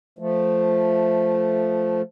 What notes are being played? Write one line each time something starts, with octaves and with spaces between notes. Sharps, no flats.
F3 A3